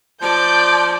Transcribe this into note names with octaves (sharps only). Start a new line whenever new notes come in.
F3 D5 A5 G6